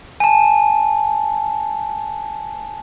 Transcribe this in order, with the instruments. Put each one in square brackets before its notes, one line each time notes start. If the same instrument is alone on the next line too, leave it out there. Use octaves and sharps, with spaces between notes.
[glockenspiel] G#5 A5